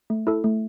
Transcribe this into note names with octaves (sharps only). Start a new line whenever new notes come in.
A3
E4 A4
A3